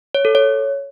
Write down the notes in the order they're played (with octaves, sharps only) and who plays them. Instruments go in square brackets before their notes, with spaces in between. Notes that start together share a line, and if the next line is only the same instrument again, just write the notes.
[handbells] C#5
A4
C#5